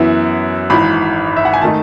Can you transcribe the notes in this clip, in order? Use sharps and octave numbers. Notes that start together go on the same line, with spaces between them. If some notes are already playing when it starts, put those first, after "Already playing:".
Already playing: F#2 E3 B3 E4
G#1 G#2 E3 B5
E5
F#5
G#5
D#3 A3 D#4 A5